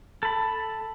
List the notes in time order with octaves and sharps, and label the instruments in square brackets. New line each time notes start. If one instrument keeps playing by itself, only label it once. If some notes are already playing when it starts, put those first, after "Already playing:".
[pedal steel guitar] A4 B5